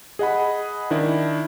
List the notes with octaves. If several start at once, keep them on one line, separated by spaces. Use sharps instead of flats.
G#4 D#5 F#5 B5
D#3 D4 E4